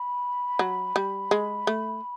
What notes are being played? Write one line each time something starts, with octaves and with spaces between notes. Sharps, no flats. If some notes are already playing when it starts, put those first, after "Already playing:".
Already playing: B5
F#3
G3
G#3
A3